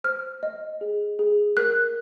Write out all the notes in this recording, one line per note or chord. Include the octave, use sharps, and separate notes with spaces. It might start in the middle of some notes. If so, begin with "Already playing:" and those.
C5 F6
D#5
G#4
G#4
A#4 F#6